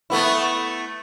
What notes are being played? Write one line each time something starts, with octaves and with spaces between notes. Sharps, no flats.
A3 B3 E4